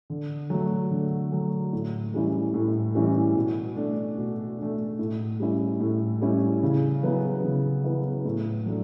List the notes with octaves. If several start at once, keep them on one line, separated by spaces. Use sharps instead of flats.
D3
F#3 A3
D3
F#3 A3
A2
E3 G3 C#4 E4
A2
E3 G3 C#4 E4
B2
A3 D4
B2
A3 D4
A2
G3 C#4 E4
A2
G3 C#4 E4
C#3
F#3 B3 E4
C#3
F#3 B3 E4
A2
F#3 A3 D4